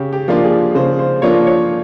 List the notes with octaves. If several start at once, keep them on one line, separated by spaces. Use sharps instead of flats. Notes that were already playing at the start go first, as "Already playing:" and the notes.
Already playing: C#3 G4
G4
F3 A#3 D4 F4
G#4
C#3 C5
C5
F3 A#3 D4 F4 C#5
C#5